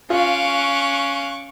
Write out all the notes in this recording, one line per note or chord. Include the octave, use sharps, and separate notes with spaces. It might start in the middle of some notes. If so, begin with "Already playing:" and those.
C#4 F4 F5 C#6 D6 F#6